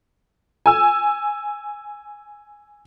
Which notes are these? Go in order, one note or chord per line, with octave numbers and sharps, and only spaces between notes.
G#5 E6